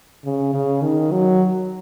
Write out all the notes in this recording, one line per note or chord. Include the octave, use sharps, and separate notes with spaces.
C#3
C#3
D#3
F#3